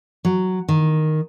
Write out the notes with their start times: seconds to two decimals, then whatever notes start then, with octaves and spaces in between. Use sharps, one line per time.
0.25 F#3
0.69 D#3